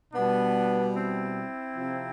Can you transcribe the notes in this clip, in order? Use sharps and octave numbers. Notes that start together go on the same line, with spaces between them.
B2 G3 B3 D4
C4 E4
C3 F3